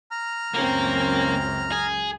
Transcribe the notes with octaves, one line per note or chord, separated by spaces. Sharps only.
A#5 F6
C#2 F#2 A#3 C4 C#4 A#4
G#4